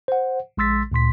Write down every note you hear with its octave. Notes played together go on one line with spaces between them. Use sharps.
C5 F#5
A#1 G#3 C6 E6 A6 B6
D2 A#2 C6 B6